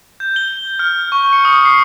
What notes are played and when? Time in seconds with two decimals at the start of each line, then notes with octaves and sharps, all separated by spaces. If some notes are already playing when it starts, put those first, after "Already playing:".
0.20 G6
0.36 G7
0.79 F6
1.12 C#6
1.33 C#7
1.45 D#6
1.65 C7